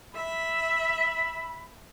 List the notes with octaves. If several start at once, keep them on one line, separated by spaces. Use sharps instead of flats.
E5 B5